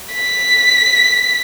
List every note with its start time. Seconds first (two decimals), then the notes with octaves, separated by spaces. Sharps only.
0.14 B6